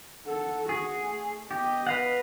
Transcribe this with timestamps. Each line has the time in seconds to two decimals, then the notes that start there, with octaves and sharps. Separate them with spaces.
0.27 A4 F#5
0.69 F#4 G#4 F#5
1.02 A3
1.51 B3 G4 D#5
1.87 B4 F5 F#5